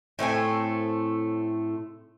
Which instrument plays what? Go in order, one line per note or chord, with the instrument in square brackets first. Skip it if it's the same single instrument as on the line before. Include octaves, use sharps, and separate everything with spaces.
[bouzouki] A2 A3 C4 G#5